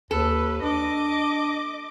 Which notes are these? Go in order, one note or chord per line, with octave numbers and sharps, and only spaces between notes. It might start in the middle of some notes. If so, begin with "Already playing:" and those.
D#2 A4 B4
D4 D#5 D6